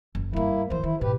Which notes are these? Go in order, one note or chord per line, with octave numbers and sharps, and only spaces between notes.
F#1
G2 G3 A#3 E4
E3 F#3 C5
D#3 E4
G#2 B2 G4 B4